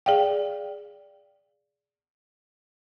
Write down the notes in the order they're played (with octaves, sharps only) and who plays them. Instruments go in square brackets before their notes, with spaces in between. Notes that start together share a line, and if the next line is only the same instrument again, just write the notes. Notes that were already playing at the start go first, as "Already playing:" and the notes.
[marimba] G#4 D5 F5 G5